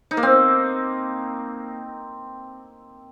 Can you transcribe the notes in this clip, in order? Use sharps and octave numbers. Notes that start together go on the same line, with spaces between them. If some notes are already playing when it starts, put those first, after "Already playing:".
D#4
A#3
C4